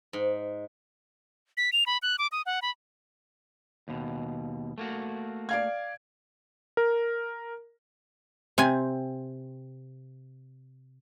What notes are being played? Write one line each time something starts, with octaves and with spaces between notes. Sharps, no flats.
G#2
B6
F7
B5
F#6
D6
D#6
F#5
B5
D#2 B2
A3 A#3 F#4
D5 F5 G#6
A#4
C3 C4 G#5